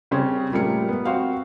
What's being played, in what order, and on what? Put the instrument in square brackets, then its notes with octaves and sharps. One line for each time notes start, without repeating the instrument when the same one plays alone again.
[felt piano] C#3 G3 C4 C#4 G#4
A#2 G3 A3 A#4 C#7
B3
C4 F#4 F5